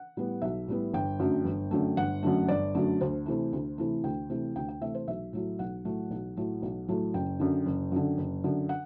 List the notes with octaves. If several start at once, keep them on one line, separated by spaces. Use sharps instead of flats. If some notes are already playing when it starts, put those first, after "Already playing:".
Already playing: F#5
A2 G3 B3
B1 E5
A2 G3 B3
G1 G5
F#2 D3 F#3 A3
G1
F#2 D3 F#3 A3
G1 F#5
F#2 D3 F#3 A3
G1 D5
F#2 D3 F#3 A3
D2 C5
C3 E3 A3
D2
C3 E3 A3
D2 G5
C3 E3 A3
D2 G5
G5
C3 E3 A3 E5
C5
B1 E5
A2 F#3 A3
B1 F#5
A2 F#3 A3
B1
A2 F#3 A3
B1
A2 F#3 A3
F#1 G5
F#2 D3
F#1
F#2 D3
F#1
F#2 D3
F#5